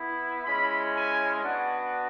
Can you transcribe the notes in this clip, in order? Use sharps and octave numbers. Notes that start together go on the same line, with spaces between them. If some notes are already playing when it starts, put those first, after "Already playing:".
Already playing: B3 E4
G#3 C#4 E4 B5
G#5
B3 D4 F#4 F#5